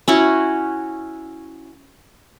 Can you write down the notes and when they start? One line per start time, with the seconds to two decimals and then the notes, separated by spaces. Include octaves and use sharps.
0.08 C#4 E4 F#4 F#5